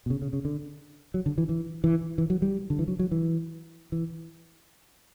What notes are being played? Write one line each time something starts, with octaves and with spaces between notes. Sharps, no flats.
B2
C#3
C#3
C#3
D3
F#3
D3
E3
E3
E3
E3
F#3
G3
D3
E3
F#3
F#3
E3
E3